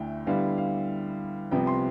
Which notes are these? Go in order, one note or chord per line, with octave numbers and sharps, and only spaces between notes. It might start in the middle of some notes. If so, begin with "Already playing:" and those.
Already playing: D2 D3 A3 E4 G5
D3 G3 B3 E4 F5
F5
C2 C3 F3 B3 G5
C6